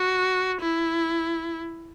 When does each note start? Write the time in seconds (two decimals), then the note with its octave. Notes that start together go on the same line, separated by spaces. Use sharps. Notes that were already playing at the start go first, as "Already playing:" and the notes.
Already playing: F#4
0.62 E4